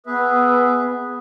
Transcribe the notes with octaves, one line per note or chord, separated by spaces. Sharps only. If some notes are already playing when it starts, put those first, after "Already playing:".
B3 G#4 B4 E5